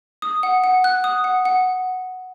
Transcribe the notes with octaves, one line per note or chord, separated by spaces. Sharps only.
D#6
F#5
F#5
F#6
D#6
F#5
F#5